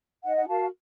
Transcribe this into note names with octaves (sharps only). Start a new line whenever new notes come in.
D#4 D#5 F#5
F#5
F#4 A#4 F5 A5